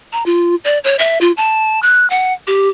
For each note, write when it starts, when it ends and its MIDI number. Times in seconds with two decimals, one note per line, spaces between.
0.12 0.23 82
0.26 0.55 65
0.64 0.78 74
0.84 0.96 73
0.99 1.19 76
1.21 1.32 65
1.37 1.80 81
1.83 2.08 90
2.10 2.33 78
2.47 2.69 67